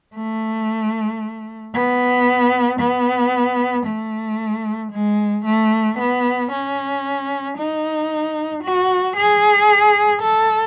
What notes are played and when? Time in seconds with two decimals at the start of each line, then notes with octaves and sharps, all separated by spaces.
0.15 A3
1.74 B3
2.80 B3
3.86 A3
4.92 G#3
5.45 A3
5.99 B3
6.51 C#4
7.57 D#4
8.64 F#4
9.16 G#4
10.23 A4